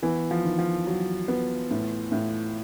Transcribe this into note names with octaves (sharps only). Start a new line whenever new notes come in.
E3 B3
F3
D#3
F3
F#3
B3
A2
A2